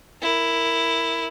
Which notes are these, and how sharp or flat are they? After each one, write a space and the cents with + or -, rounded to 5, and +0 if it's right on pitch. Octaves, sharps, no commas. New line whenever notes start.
E4 +0 A#4 -10